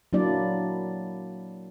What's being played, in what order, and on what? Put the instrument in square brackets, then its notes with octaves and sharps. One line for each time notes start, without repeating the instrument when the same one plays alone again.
[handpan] F#3 A#3 D4 E4 D5